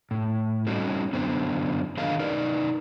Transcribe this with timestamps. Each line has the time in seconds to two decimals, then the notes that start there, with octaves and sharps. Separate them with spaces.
0.11 A2
0.67 G3 C4 C#4 D#4 F#4 A4
1.13 F#2 D3 B3 C4
1.97 D#3 D4 G#4 A#4 D#5 F5
2.19 D#4 A#4 B4 D5